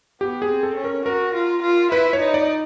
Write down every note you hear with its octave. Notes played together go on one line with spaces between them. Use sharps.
B3 G4
G#4
C4
A4
C#4
A#4
F#4 A#4
F4
F4
E4 B4
C#5
D#4
D5